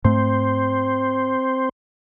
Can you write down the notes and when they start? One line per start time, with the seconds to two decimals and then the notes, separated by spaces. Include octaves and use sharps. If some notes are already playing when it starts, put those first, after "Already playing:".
0.05 G#2 A3 C4 C5